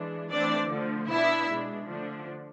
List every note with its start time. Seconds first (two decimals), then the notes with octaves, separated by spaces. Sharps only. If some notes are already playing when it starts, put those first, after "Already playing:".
Already playing: E3 G#3 D4
0.31 E3 A3 C4 D4 D5
0.70 D3 F3 A3
1.10 B2 B3 D4 E4 E5
1.49 B2 G#3 D4
1.88 D3 F3 A3 D4